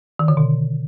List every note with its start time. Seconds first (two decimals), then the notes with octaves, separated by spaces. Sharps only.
0.19 D#3
0.28 D3
0.37 B2